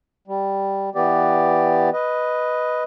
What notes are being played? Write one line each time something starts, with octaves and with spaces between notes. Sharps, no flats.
G3
E3 B3 G4 D5
B4 D#5